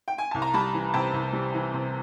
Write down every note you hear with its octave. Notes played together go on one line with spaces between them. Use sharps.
G5
G#5
C2 A5
A#5
G3 A5 B5
E3
C3 G5 A5
C2
G3
E3
C3